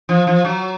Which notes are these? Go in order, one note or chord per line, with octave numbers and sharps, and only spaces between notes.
F3
F3
F#3